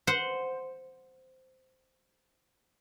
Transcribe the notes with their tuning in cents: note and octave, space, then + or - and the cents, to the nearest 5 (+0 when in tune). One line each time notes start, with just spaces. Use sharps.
C5 -10 F#5 -10